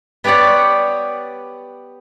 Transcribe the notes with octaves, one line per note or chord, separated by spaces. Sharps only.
B3 G4 C#5 D5 F#5